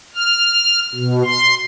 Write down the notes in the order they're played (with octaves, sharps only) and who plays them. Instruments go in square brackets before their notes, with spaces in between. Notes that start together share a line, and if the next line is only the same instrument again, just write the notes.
[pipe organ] F6
B2
C6